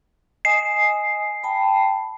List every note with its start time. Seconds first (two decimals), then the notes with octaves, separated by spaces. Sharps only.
0.45 D#5 G#5 D#6 C7
1.43 G5 A5 B5